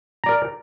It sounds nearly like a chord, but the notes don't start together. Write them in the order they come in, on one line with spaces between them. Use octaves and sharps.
A#5 D5 A#4